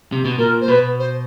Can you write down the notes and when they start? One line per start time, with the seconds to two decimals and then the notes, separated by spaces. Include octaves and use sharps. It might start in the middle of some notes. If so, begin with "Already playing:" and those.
0.12 C3
0.25 B2
0.38 A#2 A#4
0.61 C5
0.68 B2 B4
0.99 C5